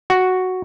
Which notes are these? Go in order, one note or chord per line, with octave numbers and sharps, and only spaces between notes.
F#4